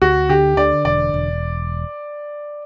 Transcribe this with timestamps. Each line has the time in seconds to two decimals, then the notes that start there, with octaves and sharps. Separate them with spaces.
0.01 D2 F#4
0.29 D3 G4
0.57 D3 D5
0.85 E1 D5
1.14 E1